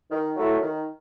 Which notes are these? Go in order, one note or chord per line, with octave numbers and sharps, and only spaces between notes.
D#3
F#3 A3 E4
D#3